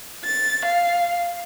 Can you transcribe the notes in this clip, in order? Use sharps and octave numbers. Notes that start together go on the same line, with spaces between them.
A6
F5